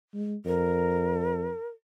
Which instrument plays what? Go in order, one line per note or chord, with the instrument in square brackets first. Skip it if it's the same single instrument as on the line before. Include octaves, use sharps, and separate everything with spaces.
[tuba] G#3
[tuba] F2 [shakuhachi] A#4